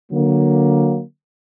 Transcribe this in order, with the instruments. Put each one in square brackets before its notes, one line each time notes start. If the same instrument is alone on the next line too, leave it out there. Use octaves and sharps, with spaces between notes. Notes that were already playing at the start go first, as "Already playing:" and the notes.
[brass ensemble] D3 F#3 A#3